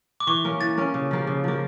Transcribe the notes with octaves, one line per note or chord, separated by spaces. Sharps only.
D6
E3 C#6
A#3 C#4
E3 A6
A#3 C#4
C#3
F3 A#3
C#3
F3 A#3